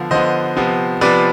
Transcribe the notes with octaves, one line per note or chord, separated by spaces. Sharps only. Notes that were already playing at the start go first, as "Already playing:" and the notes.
Already playing: D3 F3 B3 F5
D3 F3 B3 C5 D#5
C3 F3 B3
C3 F3 B3 B4 D5